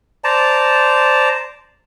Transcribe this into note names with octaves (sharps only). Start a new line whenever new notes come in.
C5 D5 A5 A#5